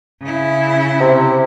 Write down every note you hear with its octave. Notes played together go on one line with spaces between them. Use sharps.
C#3 E4
C3